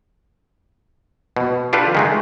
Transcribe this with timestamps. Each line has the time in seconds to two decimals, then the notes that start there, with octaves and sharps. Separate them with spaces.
1.37 B2
1.73 D4 F4 G4 A4 B4
1.95 D#3 G#3 A3